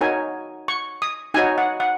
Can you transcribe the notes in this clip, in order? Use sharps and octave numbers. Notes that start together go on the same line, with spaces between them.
D#4 F#4 A#4 C#5 G#5
C#6
D#6
D#4 F#4 C#5 G#5
F#5
F#5